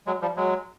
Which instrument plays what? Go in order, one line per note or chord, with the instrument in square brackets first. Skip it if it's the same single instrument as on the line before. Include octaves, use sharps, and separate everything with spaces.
[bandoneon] F#3 G#3
F3 G3
F#3 G#3